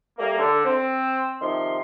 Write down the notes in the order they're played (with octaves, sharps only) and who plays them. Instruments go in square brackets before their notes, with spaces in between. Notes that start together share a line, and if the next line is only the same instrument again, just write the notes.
[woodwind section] G3 A3 A#3
D3
C4
C3 D#3 F3 C6